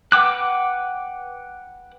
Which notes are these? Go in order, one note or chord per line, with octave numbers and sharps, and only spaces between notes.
B4 F#5 G5 D6 F#6